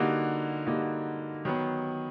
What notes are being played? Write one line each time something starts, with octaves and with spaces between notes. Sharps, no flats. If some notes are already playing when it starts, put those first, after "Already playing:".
Already playing: D3 G3 A#3 D#4 F#4
D3 G3 A#3 D#4 F#4
D#3 F#3 B3